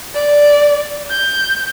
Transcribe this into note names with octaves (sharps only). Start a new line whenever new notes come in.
D5
G6